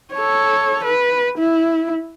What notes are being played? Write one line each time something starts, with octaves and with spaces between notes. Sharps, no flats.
A4 C#5
B4
E4